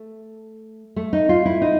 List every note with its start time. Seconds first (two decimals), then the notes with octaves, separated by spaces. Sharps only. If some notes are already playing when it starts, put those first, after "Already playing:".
Already playing: A3
0.96 A3
1.13 D#4
1.29 F4
1.45 E4
1.62 D#4